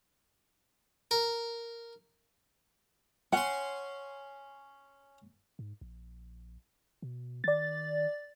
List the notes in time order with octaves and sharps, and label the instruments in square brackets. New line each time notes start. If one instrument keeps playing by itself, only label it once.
[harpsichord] A#4
[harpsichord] C#4 C6 [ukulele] F#5
[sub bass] G#2
A#1
B2
[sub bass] D#3 [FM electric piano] D5 A6